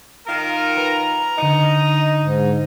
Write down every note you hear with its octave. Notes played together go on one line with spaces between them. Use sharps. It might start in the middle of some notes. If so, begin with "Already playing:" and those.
D#3 F4 A#4
B4 A#5
D3 D#4 C#7
G#2